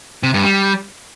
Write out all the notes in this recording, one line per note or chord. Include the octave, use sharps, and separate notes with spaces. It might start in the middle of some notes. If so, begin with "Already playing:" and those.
C3
G2
G3